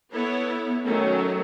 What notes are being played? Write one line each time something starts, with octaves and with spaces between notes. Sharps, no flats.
B3 E4 A4 C#5
D#3 F#3 A3 C#4